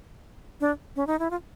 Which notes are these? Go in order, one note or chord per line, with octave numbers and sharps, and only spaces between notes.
D4
C#4
D#4
E4
F4